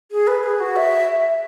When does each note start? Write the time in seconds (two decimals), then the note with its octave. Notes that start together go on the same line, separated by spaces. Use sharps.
0.11 G#4
0.27 B4
0.43 G#4
0.60 F#4
0.76 E5